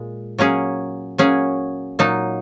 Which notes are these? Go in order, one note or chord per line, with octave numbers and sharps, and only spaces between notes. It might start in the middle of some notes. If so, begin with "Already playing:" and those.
Already playing: A#2 G#3
F#3 A#3 C#4 G#4
F#3 A#3 C#4 G#4
A#2 F#3 A#3 D#4